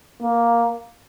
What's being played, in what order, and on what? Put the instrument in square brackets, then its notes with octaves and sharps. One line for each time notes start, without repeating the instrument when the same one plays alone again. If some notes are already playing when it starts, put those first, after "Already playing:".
[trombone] A#3